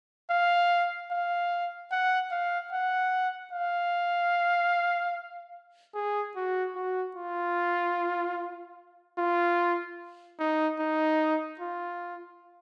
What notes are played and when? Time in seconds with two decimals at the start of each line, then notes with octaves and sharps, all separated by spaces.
0.30 F5
1.11 F5
1.92 F#5
2.31 F5
2.73 F#5
3.53 F5
5.95 G#4
6.36 F#4
6.75 F#4
7.16 F4
9.18 F4
10.40 D#4
10.80 D#4
11.60 F4